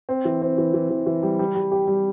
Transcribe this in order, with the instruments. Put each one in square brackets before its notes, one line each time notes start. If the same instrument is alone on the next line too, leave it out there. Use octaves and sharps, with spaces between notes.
[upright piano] C4
E3
C4
E3
E3
E3
E3
G3
G3
G3
G4
G3